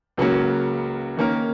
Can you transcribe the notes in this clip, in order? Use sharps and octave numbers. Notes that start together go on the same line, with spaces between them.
C#2 C#3 F#3 A#3 C#4
D#3 A#3 C#4 A#4